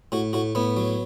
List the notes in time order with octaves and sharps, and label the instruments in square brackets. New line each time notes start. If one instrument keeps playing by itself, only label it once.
[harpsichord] A2 F#4
A2 F#4
A2 B3
F#3